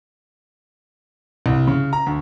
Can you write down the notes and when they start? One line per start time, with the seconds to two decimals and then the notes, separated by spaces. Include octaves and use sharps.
1.46 C2
1.67 C#3
1.93 A#5
2.06 D2